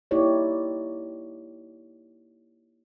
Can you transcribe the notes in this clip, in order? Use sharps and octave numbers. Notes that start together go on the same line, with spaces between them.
A#3 D#4 E4 G4 C#5 D5